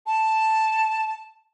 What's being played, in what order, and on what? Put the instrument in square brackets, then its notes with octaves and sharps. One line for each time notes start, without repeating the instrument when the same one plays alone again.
[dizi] A5